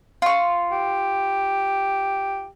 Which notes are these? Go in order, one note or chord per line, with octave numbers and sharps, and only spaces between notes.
F4 C#6
G4